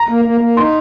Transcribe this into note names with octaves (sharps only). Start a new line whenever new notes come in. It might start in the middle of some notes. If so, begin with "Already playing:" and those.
Already playing: A#5
A#3
A#3
A#3
D#4 C6